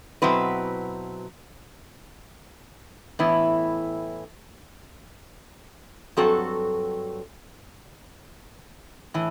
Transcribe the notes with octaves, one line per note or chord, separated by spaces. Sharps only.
B2 F#3 C4 E4 B4
A2 E3 B3 E4
G2 F#3 C4 F#4 A4
A2 E3